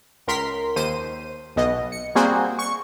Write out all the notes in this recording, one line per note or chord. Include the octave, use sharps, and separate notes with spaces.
C#2 A#4 C6 B6
D#2 C5 D#7
B1 B2 D#5
C#7
G3 A#3 C4 F#4 G#4 C5
C#6 C#7